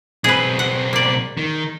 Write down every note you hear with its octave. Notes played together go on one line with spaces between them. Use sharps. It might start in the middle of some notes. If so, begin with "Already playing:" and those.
B1 C4 G#4 B4
F#5
A#3 D5
D#3